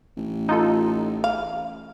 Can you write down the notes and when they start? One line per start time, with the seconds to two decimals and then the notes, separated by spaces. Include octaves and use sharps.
0.17 A1
0.49 D#4 F4 A4
1.24 F5